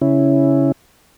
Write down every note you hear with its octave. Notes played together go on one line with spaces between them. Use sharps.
C#3 C#4 E4